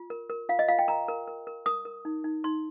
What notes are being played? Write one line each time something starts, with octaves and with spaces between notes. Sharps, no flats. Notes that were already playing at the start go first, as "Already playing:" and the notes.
Already playing: F4
A#4
A#4
F4 F5
D#5
F4 F5
G5
A#4 A#5
A#4
A#4
A#4
A#4 D#6
A#4
D#4
D#4
D#4 C6